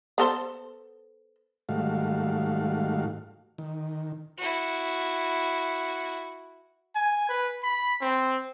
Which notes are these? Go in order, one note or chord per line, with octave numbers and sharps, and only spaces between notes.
B3 A4 C5
G#2 D#3 G3 A3 F#4 F5
D#3
E4 F#4
G#5
B4
B5
C4